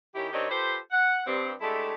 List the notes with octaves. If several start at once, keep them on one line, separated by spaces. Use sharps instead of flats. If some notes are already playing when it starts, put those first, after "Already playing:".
D#3 C#4 E4 G4
D#3 C4 D4 G4 C#5 D#5
F4 G4 A4 B4 C5
F#5
G2 C4
G#3 A3 D4 E4 G4 A4